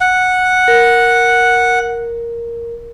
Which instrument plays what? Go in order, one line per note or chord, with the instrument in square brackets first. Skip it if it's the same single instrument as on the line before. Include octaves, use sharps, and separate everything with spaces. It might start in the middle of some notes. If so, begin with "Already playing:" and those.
[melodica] F#5
[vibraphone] A#4